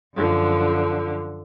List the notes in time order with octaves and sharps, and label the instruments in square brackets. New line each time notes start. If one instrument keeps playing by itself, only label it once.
[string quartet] F#2 D3 F3